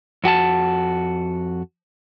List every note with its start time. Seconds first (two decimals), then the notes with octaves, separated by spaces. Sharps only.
0.24 F2 F#4 G#5 A5